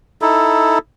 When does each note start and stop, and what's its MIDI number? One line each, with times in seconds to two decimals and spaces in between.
0.22 0.78 63
0.22 0.78 64
0.22 0.78 69